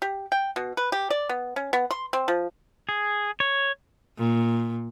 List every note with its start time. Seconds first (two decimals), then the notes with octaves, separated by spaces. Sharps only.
0.02 G4
0.32 G5
0.56 B2
0.77 B4
0.92 G4
1.10 D5
1.29 B3
1.56 C#4
1.73 B3
1.91 C6
2.13 C4
2.28 F3
2.89 G#4
3.40 C#5
4.19 A#2